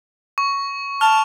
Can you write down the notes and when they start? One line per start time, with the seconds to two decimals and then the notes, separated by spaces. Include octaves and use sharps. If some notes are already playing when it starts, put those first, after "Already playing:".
0.38 C#6
1.01 A5 F6 F7